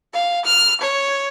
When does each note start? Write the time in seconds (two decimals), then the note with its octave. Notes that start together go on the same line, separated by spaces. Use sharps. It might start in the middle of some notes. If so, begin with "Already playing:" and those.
0.13 F5
0.45 F6
0.81 C#5